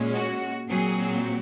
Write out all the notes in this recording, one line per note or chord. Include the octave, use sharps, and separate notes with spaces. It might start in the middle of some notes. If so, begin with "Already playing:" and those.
Already playing: A#2 G#3 C#4
F#4
A#2 F#3 C4 G#4